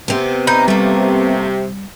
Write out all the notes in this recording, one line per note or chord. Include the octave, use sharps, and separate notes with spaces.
C3 B3 C4
D#4 B5 G6
G3 A3 A#3